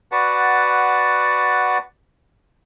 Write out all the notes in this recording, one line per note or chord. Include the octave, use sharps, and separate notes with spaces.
F#4 B4 D5 F#5 A5